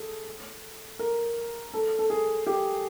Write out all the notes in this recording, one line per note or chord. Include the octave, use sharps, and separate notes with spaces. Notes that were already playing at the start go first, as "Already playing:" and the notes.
Already playing: G#4 A4
A#4
A4
A4
G#4
G4